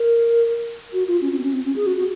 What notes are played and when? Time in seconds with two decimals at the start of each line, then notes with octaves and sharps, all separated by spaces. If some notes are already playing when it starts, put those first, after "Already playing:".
Already playing: A#4
0.93 F#4
1.08 F4
1.21 C#4
1.32 C#4
1.38 C4
1.44 C#4
1.53 C4
1.65 C#4
1.76 G#4
1.87 F#4
1.97 F#4